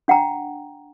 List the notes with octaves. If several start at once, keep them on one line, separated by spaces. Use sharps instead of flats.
D4 F#5 G5 A#5